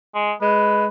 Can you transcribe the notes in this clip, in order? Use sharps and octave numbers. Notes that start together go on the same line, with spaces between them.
G#3
G#3 B4